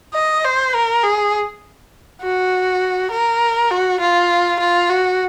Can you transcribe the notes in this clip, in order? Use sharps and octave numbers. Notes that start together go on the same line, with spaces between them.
D#5
C5
A#4
G#4
F#4
A#4
F#4
F4
F4
F#4